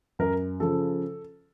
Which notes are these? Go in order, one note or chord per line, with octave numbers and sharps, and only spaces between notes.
F#2 A#4
C#3 F3 A4